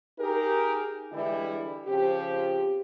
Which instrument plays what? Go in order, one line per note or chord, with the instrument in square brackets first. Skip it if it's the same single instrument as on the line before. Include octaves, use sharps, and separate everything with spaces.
[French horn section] D#4 G4 G#4 A#4
D3 E3 G3 G#3 E4
C#3 F3 C4 G4